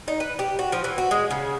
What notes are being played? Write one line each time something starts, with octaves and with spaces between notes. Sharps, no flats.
D#4
B4
G4
F#4
F3
E3
F#4
G#3
C#3